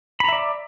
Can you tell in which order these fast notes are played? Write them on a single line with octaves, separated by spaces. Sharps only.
B5 A#5 E5 D5